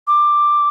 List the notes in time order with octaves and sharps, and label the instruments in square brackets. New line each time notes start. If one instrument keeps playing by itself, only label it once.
[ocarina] D6